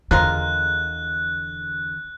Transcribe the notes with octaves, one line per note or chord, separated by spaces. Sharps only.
E2 D3 F3 G#3 A#4 F#6